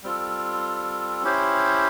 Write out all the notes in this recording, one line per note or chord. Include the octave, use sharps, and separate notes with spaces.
G3 C4 F4 A4
C#4 E4 G4 C5